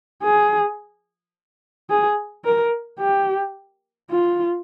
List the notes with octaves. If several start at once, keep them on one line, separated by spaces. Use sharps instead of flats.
G#4
G#4
A#4
G4
F4